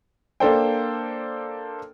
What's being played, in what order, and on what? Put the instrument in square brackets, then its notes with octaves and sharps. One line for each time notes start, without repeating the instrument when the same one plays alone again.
[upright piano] A#3 D4 A4 C5 G5